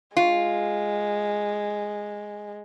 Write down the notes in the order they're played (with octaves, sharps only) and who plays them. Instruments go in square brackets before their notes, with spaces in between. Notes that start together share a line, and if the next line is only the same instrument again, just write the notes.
[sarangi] G#3 [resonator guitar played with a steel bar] F4